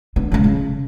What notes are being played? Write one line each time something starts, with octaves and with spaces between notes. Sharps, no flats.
D3 B3
C#3 G#3
C#3